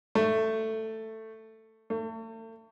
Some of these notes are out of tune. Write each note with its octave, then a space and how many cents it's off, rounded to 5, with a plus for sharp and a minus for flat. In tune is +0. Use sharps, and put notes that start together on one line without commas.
A3 +10
A3 +40